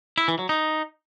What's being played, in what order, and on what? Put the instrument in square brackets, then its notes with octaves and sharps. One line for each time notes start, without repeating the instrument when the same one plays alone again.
[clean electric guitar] E4
E3
F#3
D#4